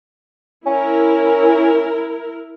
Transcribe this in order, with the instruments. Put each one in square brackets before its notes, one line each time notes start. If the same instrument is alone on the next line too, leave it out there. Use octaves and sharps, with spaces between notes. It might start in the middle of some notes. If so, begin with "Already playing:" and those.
[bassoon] C#4 [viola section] E4 A#4